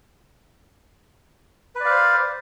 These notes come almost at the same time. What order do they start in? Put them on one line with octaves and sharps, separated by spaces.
B4 D5 F5 C5